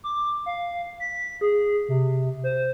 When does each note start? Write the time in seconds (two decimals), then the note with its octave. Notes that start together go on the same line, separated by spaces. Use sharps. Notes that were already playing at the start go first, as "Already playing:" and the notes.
0.04 D6
0.46 F5
1.00 B6
1.41 G#4
1.89 C3
2.44 C5